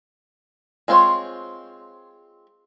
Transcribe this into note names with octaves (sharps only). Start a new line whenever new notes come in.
G#3 C4 F4 C5 C#5